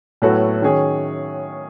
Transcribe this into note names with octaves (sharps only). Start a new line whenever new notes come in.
A2 F#3 B3 F#4 A4
D#3 F#3 C#4 G#4 C#5